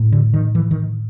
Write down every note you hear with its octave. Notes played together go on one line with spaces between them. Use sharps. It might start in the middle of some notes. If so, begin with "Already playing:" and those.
Already playing: A2
D3
D#3
E3
D#3